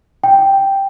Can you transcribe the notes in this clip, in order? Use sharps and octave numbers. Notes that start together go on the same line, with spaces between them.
G5